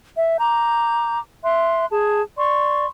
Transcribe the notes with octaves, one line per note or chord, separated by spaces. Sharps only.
E5
A#5 D6 G6
E5 C6 F#6
G#4 A5
D5 C6 C#6